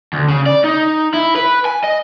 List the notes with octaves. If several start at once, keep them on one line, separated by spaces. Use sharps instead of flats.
D2
C#3
D5
D#4
E4
B4
G#5
D#5